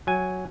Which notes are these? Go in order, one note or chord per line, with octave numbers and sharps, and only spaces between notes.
F#3 G#5